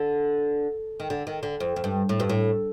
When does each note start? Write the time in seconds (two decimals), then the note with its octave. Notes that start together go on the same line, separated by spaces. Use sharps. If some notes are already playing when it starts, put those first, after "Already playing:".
Already playing: D3
1.00 D#3
1.10 D3
1.27 D#3
1.43 D3
1.60 F2
1.76 F2
1.84 G2
2.09 A2
2.20 G2
2.29 A2